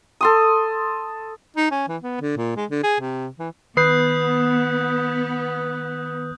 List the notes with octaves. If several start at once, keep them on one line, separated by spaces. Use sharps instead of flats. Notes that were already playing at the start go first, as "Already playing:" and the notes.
A4 C6 D#6
D#4
C#4
E3
B3
D3
A#2
G#3
D3
G#4
C3
E3
D#3 B3 B4 D#6 F#6 G6 C7